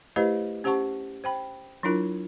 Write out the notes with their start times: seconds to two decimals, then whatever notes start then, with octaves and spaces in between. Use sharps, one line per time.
0.16 A3 E4 G4 B4 C5 D#5
0.64 C#4 G4 C5 F#5 A5 C#6
1.24 C5 G5 B5
1.83 F#3 D4 E4 F4 A#4